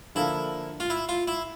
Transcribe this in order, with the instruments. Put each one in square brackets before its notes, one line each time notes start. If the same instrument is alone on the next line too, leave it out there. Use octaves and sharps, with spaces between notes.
[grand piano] D3 F3 A#3 D4 A4 [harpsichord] E4
[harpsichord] F4
E4
F4
E4